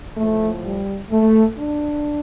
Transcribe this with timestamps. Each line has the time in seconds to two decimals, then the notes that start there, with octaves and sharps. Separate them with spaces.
0.17 A2 F3 A3
0.65 G3
1.11 A3
1.57 D4